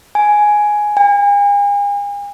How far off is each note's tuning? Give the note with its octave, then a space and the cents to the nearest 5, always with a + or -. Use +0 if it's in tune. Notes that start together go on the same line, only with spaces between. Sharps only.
G#5 +5
G#5 -40